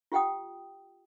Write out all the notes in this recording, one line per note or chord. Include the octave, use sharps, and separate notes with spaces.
F4 G4 F#5 G5 D#6